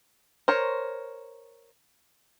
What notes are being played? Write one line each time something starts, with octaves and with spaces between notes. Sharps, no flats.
A#4 C5 C#5